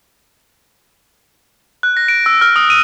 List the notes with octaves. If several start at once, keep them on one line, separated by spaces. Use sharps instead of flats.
F#6
A#6
D7
E6
F6
D#6
D#7